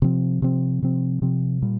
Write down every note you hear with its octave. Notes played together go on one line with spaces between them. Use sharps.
C3 F3 C4
C3 F3 C4
C3 F3 C4
C3 F3 C4
A#2 G3